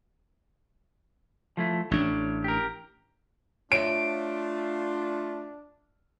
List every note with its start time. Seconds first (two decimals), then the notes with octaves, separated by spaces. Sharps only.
1.57 F3 A3 E4
1.91 A1 A2 D4 C#5
2.44 G4 A#4
3.72 A3 D4 F4 C#5 E5 D7